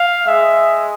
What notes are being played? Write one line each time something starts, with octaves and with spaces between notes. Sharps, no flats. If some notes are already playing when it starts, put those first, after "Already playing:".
Already playing: F5
G#3 E5